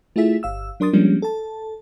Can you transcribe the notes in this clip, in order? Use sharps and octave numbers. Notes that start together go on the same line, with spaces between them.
A3 E4 F4 G#4 E5 B6
G1 F5 E6
F#3 D4 A#4 C6 D#6 A6
F3 G3 G#3 A#3 C#4 D4
A4 A5